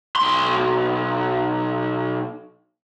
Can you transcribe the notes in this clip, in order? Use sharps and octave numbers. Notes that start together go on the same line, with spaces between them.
B1 C6